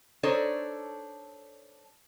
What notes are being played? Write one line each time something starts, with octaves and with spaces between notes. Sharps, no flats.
D4 D#4 A4 C5 C#5